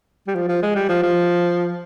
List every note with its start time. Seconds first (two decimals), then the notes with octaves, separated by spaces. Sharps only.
0.28 G3
0.36 F3
0.49 F3
0.63 G#3
0.75 G3
0.89 F3
1.03 F3